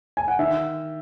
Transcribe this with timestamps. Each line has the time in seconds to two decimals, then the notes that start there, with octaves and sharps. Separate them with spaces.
0.17 G#5
0.28 F#5
0.39 D#3 E5